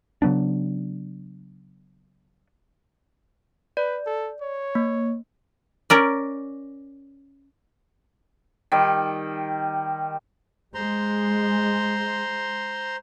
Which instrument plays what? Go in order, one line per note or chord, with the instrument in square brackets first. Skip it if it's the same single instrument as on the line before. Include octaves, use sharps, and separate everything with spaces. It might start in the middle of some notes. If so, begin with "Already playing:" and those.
[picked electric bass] C#3 F#3 B3 D4
[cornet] B4 [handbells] D5
[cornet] A4
C#5
[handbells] A#3
[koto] C#4 A#4 D5
[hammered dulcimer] D#3 G3
[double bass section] G#3 [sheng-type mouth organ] C5 A#5 C6